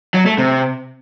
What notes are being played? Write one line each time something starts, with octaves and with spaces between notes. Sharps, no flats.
F#3
A3
C3